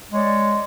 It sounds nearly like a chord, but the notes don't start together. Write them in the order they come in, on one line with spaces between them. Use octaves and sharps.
G#3 C#5 D5